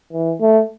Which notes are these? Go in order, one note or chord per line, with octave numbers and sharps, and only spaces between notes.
E3
A3